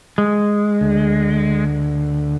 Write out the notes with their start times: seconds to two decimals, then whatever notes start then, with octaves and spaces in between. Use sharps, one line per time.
0.18 G#3
0.81 D2